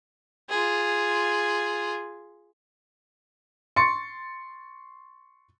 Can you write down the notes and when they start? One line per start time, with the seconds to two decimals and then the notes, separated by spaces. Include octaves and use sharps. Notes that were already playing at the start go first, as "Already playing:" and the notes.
0.49 F4 G#4
3.76 C6 C#6 A6 C#7